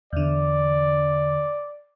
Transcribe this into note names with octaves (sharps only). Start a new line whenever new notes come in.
E2 D3 D5